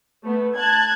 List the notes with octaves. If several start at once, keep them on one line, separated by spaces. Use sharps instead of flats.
A3 B3
A5 F#6 G#6